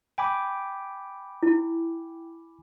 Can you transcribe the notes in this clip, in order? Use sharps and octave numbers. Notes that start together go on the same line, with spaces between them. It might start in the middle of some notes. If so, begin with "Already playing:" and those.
G5 G#5 B5 D6
E4